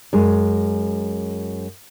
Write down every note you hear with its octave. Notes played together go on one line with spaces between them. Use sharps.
F#2 G#3